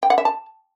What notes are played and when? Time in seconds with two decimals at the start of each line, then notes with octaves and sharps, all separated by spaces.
0.03 G5
0.10 F#5
0.18 E5
0.25 A5